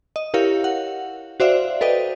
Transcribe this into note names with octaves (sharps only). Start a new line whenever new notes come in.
D#5
E4 G4 A#4 C#5 F5
F#5
F#4 C5 D5 E5 F5
A4 B4 D5 D#5 G5